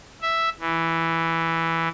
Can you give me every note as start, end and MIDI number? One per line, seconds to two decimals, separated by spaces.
0.22 0.49 76
0.60 1.88 52